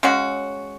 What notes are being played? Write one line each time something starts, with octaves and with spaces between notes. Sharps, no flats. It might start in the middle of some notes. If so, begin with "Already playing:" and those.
C#3 G#3 C#4 F#4